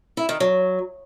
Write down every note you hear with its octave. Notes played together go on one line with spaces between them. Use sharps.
E4
D#3
F#3